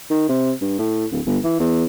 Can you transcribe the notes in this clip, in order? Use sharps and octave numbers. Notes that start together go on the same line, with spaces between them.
D#3
C3
G2
A2
D1
G1
E3
E2